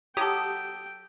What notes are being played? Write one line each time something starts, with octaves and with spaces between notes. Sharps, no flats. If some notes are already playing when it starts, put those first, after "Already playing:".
F#3 F#4 G4 A4 G5 D#6